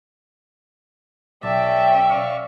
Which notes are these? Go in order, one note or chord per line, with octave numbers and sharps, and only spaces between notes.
B1 C#4 D5 E5 G5 A5
D5 F5 C#6